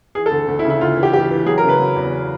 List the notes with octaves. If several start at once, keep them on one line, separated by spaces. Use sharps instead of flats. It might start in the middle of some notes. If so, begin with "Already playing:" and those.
E3 G#4
A4
D2
D2
E4
C#3
E4
D2 F4
E3
G4
E3 G4
E3
F#3 G#4
A#4
C#3
B4
F#3
E2